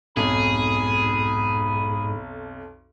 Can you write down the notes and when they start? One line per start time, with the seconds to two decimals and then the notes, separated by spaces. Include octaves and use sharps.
0.17 B1 F2 G#2 G#4 B5